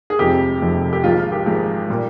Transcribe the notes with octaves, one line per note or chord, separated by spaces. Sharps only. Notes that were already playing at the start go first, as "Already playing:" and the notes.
G#4
F1 F2 C3 F3 G#3 G4
F1 F2 C3 F3 G#3
G4
G#1 G#2 F3 G#3 F4
F4
G4
G#1 G#2 F3 G#3
A#2 G3